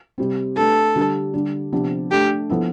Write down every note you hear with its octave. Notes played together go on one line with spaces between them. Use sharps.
C3 G3 C4
A3 D4 G4 A4 B4
D3 G3 D4
D3 G3 D4
C3 F3 B3 D4
A3 D4 G4 A4
F3 B3 E4 A4